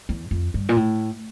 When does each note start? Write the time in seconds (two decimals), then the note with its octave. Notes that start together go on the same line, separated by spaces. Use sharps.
0.09 E2
0.31 F2
0.54 G2
0.69 A#2
0.76 A2